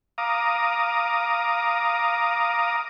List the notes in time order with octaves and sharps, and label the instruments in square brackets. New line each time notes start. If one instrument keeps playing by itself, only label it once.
[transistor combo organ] F5 A#5 D6 D#6